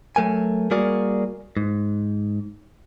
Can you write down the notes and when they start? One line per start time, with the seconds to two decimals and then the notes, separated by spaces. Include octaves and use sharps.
0.16 F#3 A3 A#4 G#5
0.71 G3 A#3 F#4 G#4 A#4 D5
1.57 G#2